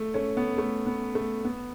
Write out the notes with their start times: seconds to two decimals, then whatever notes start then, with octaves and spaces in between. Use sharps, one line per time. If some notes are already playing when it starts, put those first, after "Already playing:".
Already playing: A3
0.14 A3 C#4
0.37 B3
0.58 A3
0.86 B3
1.15 A3
1.45 B3